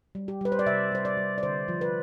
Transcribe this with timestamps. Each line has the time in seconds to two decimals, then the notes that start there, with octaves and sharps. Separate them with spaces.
0.15 G3
0.28 G4
0.41 G3 B4
0.52 C5
0.59 D5
0.66 C3 E5
0.92 G3 C5
1.05 D5
1.17 G3
1.38 D5
1.43 D3 C5
1.68 F3
1.81 B4